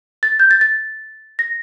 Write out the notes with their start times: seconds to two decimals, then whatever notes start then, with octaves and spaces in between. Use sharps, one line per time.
0.23 A6
0.40 G6
0.51 A6
0.61 A6
1.39 A#6